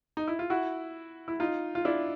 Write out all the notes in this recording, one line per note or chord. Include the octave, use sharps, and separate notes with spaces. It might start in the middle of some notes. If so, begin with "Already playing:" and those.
D#4
E4
F4
E4 F#4
E4
D#4 F4
F4
D4 E4